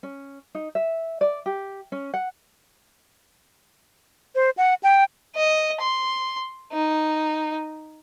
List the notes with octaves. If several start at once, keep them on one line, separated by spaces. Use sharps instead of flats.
C#4
D#4
E5
D5
G4
C#4
F#5
C5
F#5
G5
D#5
C6
D#4